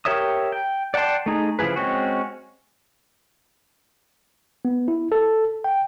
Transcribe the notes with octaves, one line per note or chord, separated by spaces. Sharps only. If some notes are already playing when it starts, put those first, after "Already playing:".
G4 A#4 C#5 E5 D#6
G5
D5 F#5 G5 A5 C6
A3 D#4 G#4
C#3 F3 E4 G#4 B4
G#3 C4 C#4 F#4
B3
E4
A4
G5